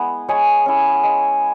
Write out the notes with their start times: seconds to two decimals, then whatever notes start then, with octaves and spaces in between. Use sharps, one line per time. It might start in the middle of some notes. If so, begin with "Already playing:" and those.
Already playing: G#3 B3 E4
0.28 G#3 G#4 C#5
0.66 C#4 E4
1.03 G#3